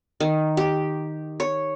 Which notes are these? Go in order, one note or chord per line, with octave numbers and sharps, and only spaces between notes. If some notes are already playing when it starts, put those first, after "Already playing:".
D#3
G4
C#5